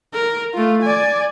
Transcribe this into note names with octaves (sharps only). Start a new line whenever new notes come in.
A#4
A3 F4
D5 G#5